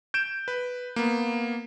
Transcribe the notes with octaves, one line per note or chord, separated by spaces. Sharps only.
G6 D7 E7
B4
A#3 B3